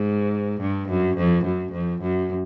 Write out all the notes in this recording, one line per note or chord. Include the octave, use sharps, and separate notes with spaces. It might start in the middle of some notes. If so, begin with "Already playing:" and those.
Already playing: G#2
G2
F#2
F2
F#2
F2
F#2